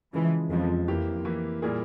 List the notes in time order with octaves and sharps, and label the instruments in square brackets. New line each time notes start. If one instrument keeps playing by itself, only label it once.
[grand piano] C#3 F3 G#3 [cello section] E3
[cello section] F2 [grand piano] C#3 F3 G#3
[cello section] F2 [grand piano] E3 A#3 E4 G4
[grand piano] E3 A#3 E4 G4
A#2 G3 A#3 E4 G#4